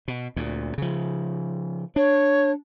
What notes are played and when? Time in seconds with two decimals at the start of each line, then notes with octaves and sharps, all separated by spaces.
0.08 B2
0.36 D2 A#2
0.78 C#3 F3
1.96 D4 C#5